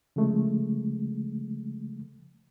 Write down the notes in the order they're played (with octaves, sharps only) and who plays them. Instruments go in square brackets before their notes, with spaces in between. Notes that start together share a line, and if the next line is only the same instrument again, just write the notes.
[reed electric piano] C#3 F3 G#3 A3